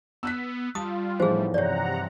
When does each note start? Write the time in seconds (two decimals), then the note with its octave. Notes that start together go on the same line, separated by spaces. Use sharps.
0.23 B3 E6 F#6 B6
0.75 G3 F4 A5 D#6
1.20 E2 A2 E3 F3 D#4 G#4 C5
1.54 G2 C3 C#5 D5 F#5 A#5